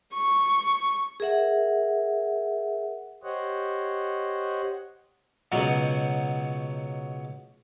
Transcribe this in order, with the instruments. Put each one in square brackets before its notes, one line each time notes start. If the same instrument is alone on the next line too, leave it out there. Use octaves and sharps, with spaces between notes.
[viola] C#6
[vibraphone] G#4 A#4 E5 F#5
[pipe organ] G4 C5 C#5 D#5 F#5
[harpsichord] C#2 B2 F#3 F#4